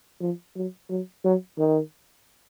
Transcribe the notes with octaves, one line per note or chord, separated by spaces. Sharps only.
F3
F#3
F#3
F#3
D#3